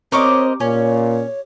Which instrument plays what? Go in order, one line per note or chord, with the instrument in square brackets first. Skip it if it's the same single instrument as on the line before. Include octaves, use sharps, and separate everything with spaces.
[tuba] C4 [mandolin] G4 C#6 D6 [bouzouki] A#4 C5 D#5 [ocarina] C#5
[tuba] A#2 [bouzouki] C#4 [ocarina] C#5